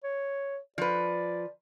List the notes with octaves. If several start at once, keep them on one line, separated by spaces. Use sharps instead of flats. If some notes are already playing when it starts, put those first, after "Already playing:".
C#5
F3 B4 D5